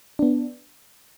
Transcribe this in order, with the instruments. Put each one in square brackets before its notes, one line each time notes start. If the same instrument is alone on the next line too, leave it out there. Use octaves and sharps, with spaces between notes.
[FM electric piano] B3 D4